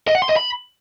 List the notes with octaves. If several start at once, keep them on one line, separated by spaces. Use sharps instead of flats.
D#5
F#5
C6
D#5
B5